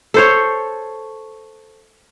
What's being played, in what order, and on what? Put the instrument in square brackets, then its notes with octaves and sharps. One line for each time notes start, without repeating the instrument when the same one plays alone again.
[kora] A4 C5 C#5